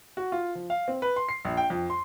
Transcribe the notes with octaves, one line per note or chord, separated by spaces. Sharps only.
F#4
F4
F3
F5
C4
B4
C6
C7
A#1
G5
F2
C6